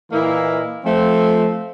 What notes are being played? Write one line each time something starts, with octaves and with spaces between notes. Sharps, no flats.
A#2 E3 A#3 E4 D#5 F5
F3 A3 C4